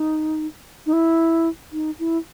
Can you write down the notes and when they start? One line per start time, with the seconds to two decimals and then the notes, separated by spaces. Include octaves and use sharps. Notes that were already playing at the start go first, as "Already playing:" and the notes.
Already playing: D#4
0.86 D#4
0.93 E4
1.72 D#4
1.99 E4